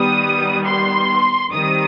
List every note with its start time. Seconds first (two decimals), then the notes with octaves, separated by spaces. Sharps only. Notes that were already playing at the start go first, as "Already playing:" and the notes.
Already playing: D#3 G3 B3 D#6
0.66 C6
1.53 D#3 G3 C4 D#6